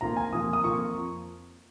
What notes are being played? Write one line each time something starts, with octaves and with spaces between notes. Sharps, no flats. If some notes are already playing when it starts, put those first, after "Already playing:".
F2 F3 A#3 F4 A#5
G#5
F2 F3 A#3 F4 D#6
D#6
F2 F3 A#3 F4 C#6